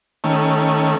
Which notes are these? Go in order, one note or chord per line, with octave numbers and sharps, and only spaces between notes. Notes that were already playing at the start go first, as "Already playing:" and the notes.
D#3 A3 C#4